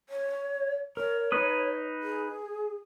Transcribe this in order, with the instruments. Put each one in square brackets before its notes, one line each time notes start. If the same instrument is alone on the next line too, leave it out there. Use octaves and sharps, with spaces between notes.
[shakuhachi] C#5
[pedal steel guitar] A#4 [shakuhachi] C#5
[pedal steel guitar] D#4 B4 D#6
[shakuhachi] G#4